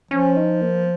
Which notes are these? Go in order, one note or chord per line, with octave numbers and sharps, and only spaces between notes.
F3 C#4
D#4
A#3